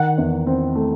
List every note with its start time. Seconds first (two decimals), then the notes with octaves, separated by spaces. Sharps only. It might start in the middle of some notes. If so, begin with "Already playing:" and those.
Already playing: D#3 F#5
0.18 E2
0.47 C4
0.75 A3